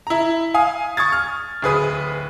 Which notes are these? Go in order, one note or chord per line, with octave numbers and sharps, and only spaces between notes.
E4 A#5
F5 G#5 D#6
C#6 D#6 G#6 A6
F6
D1 G#4 B4 D#6